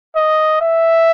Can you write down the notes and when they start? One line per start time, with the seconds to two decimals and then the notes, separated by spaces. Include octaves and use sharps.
0.16 D#5
0.61 E5